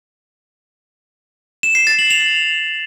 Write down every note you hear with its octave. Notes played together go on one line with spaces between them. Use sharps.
E7
C7
A6
F#7
F7